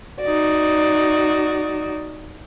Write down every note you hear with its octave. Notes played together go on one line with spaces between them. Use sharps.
D#4 F#4 D5